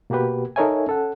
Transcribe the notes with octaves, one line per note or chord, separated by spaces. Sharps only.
B2 A#3 F#4 G4 B4
D#4 A4 A#4 C#5 E5 G#5
C#4 A4 F#5